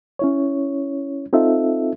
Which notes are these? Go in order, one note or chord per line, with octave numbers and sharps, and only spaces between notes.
C#4 E4 C#5
C4 D#4 F4 A4 E5